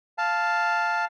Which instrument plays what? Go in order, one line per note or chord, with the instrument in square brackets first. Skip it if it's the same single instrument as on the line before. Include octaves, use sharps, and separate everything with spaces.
[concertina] F5 A5